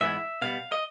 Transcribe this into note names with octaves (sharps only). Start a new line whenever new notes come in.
G#2 E3 G#3 B3 E4 E5
B2 G3 B3 F5
D#5